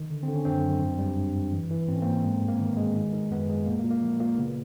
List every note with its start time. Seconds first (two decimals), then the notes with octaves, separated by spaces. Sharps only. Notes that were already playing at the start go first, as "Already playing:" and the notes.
Already playing: D#3
0.10 D3
0.23 D3 C4
0.35 C#4
0.45 F#2 C4 D4
0.62 F#2
0.81 G2
0.98 G3
1.17 G2
1.35 G2
1.52 E3
1.70 E3
1.88 G#2 C4
1.96 C#4
2.02 G#2 A#3 C4
2.24 G#3
2.41 G2
2.48 A#3
2.59 D#3 B3
2.77 G#3
2.96 D#3
3.13 D#3
3.30 F#2 B3
3.49 G#3
3.66 A#2 A#3
3.79 A#3
3.84 A#2
3.91 A#3
4.03 F3
4.20 A#2 A#3
4.38 C#3 B3